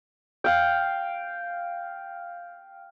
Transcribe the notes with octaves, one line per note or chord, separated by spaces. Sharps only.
F5 G5